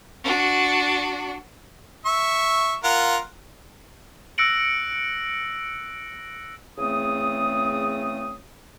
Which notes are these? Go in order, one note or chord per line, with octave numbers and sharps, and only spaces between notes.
D4 F#4
E5 C#6
F4 A#4 F#5
E6 F#6 A#6 C#7 D7 F#7
E2 C#3 A3 C4 D#6